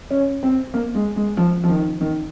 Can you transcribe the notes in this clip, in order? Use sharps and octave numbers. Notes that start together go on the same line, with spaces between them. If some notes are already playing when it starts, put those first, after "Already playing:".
C#4
C4
A#3
G#3
G#3
F3
F3
D#3
D#3